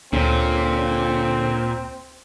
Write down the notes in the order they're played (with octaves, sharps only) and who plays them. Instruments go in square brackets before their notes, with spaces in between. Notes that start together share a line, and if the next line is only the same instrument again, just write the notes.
[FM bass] D2 [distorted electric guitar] A#2 [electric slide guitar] D3 C#4 [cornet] C4